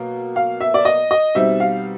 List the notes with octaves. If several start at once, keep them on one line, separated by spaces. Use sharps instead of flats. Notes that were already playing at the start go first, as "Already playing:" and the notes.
Already playing: B2 F#3 A#3
F5
E5
D5
D#5
D#5
B2 G3 C4 D#4 E5
F5